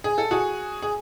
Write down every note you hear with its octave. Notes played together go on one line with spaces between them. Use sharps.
G#4
A4
F#4 G#4
G#4